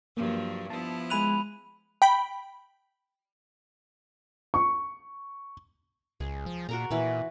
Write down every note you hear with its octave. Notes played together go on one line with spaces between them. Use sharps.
G2 F3 F#3 A#3
F3 B3 E4 A5
G#3 G#5 B5 F#6 D#7 F7
G5 B5
C#6
C#2 G#4
F3
A#2 F#4 A#4 A#5
A#2 E3 B4